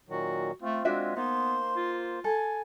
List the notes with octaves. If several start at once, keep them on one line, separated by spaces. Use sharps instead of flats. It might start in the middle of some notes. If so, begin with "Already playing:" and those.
A#2 D#3 F#3 F#4
A3 C4 F4
G#3 D4 F#4 E5
A#3 B3 D#4 C5 C6
F4
A4 G#5